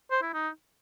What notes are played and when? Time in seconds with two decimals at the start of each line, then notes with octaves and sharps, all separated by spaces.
0.11 C5
0.22 E4
0.34 D#4